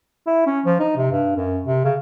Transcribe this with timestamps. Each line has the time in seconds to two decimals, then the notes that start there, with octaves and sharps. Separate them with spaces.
0.27 E4
0.47 C#4
0.66 F3
0.80 D#4
0.96 C3
1.12 G2
1.36 F#2
1.65 C3
1.84 C#3